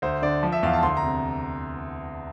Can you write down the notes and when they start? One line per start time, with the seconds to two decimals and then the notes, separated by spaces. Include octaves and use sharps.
0.02 D2 C5
0.22 D3 D5
0.43 F3
0.52 E5
0.63 E2 F5
0.73 A5
0.83 D2 C6
0.97 A#5
1.03 C3